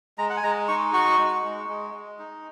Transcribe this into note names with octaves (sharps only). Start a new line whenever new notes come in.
G#3 A#5
F#5
G#5
G#3 A#5
D#4 C#6
F#4 C#6
G#3
G#3
G#3
G#3
D#4